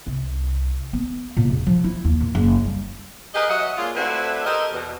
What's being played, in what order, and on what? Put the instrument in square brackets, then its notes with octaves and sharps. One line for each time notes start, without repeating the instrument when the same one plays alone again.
[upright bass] C2
B3
A#2
E1
F3
E4
D#2
A#2
F#1
G3
[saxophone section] G4 G#4 A#4 B4 D#5
F#3 C#5 D#5 E5 F#5
G#3 A#3 C#4 D4 F4
A3 C4 D4 E4 F#4 B4
G4 A4 A#4 C5 D#5
E2 B2